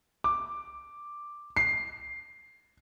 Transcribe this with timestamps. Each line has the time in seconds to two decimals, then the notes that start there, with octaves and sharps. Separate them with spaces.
0.24 D6
1.57 C7